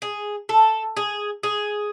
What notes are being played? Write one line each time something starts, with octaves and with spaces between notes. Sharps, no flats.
G#4
A4
G#4
G#4